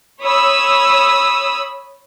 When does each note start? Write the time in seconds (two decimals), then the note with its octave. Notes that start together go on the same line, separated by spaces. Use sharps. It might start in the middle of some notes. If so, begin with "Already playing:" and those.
0.21 C#5 B5 D#6 E6